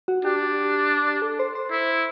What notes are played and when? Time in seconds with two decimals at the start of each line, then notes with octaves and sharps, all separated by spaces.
0.08 F#4
0.25 D4 G4
1.22 A4
1.39 C5
1.55 C5
1.71 E4